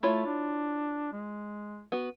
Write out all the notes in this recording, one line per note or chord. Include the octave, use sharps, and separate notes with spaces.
A3 E4 F4 C#5
D4
G#3
B3 F#4